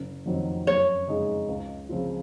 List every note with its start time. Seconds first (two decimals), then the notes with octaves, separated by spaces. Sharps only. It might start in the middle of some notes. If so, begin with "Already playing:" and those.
Already playing: F#1
0.26 F2 D#3 F#3 C4
0.67 F#2 C#5
1.07 C#3 G#3 D#4 G#4
1.48 C#2
1.89 C#3 F3 C4 F4